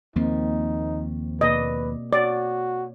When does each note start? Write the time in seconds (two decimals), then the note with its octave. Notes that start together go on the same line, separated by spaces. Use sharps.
0.16 D#2 F3 A#3 C4 D#4
1.41 B2 A#3 B4 D5 D#5
2.13 F#4 C#5 D5